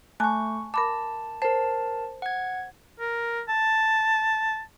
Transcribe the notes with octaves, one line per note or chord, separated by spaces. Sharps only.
A3 G#5 A5 C#6 F#6
A#4 A5 B5 D6
A#4 C5 A5
F#5 G#6
A#4
A5